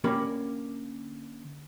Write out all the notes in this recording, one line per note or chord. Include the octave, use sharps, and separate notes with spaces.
D3 A#3 C#4 G4 A#4 B5